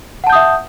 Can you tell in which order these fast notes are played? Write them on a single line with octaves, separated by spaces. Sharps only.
F#5 A5 G6 D#6 E5